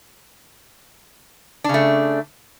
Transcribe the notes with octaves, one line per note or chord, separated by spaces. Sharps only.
C#3 A3 D4